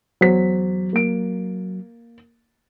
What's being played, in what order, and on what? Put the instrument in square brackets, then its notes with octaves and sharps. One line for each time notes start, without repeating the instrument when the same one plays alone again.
[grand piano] E2 C5 B6 [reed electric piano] F#3
[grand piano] A#3 D7